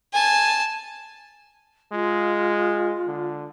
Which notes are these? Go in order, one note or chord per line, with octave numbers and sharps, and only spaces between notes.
G#5 A5
G#3 F4
D3